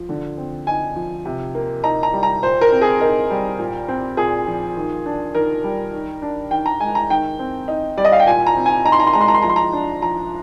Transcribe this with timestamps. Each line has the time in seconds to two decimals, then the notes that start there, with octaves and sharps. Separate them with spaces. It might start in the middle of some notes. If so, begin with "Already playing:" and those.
Already playing: F3
0.09 D3
0.37 C4
0.67 D#4 G#5
0.96 F3
1.25 C3
1.55 A#3
1.83 D#4 A#5
2.03 A#5
2.13 G3
2.23 A#5
2.42 A#2 C5
2.61 A#4
2.72 C4
2.81 G#4
3.00 D#4 A#4
3.31 G3
3.59 A#2
3.88 C4
4.17 A#2 G#4
4.47 F3
4.76 D#3
5.06 D4
5.35 D#3 A#4
5.64 G3
5.93 D#3
6.22 D4
6.51 D#3 G5
6.66 A#5
6.80 G#3 G#5
6.95 A#5
7.10 D#3 G5
7.39 C4
7.68 D#4
7.97 G3 D5
8.05 D#5
8.12 F5
8.20 G5
8.27 A#2 G#5
8.47 A#5
8.56 C4
8.66 G#5
8.85 D#4 A#5
8.92 C6
9.00 A#5
9.07 C6
9.13 G#3 A#5
9.21 C6
9.28 A#5
9.34 C6
9.42 F3 A#5
9.49 C6
9.56 A#5
9.73 D4
10.02 F3 A#5